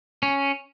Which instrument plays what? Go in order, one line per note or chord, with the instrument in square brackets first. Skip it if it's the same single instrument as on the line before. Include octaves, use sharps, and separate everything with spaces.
[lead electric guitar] C#4